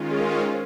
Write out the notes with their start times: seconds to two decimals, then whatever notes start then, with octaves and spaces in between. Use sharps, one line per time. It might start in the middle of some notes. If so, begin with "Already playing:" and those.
Already playing: D#3 G#3 C#4 F4
0.11 G#4
0.20 A#4
0.31 A#4
0.41 C5